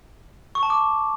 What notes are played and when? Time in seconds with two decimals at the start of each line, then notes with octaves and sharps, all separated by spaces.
0.55 C#6
0.63 A5
0.70 D6
0.78 C#6